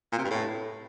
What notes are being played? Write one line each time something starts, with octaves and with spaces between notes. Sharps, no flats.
A#2
C3
G2
A2